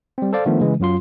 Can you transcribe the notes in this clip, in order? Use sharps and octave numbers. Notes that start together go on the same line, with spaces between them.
G3 C4
A4 C5 D5 F5
D#3 F3 A3 B3 D4
C#3 E3 G#3
F#2 F#3 F4 C6